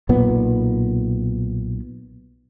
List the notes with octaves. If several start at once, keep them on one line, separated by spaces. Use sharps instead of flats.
B1 A#2 B3